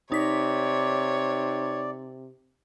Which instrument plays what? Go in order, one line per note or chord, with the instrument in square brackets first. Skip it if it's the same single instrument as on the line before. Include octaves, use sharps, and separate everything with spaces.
[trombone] C3 [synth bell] D#4 B6 [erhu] C#5 [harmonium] D5